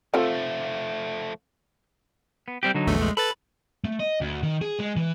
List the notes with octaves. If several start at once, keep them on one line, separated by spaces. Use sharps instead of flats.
F3 A3 C4 F4 A4
B3
G3 C4 G4
D3 F#3 D#4
A#1 E2 A3
G#3
A4 B4 B5 A6
A3
D#5
D2
D#3
G#4
G#3
E3